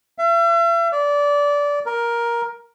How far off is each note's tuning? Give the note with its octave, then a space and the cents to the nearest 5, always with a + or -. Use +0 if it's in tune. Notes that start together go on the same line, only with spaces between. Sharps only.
E5 +40
D5 -20
A#4 +10